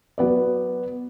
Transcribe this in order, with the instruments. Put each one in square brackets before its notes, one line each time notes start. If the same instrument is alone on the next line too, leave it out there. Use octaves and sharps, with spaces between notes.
[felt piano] F#3 B3 B4 D5